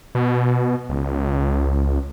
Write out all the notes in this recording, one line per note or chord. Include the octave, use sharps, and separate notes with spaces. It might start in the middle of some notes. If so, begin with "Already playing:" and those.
B2
C#2